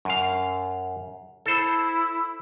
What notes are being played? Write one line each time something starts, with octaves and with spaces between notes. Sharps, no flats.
F#2 F5
E4 A4 C5